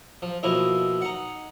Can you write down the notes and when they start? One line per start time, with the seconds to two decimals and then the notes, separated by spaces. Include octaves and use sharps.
0.22 F3
0.43 B2 F3 A#3 E4 D#5
1.01 D#4 F#5